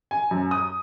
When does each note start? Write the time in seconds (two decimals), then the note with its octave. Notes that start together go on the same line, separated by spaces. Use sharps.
0.11 G#5
0.31 F#2
0.51 D#6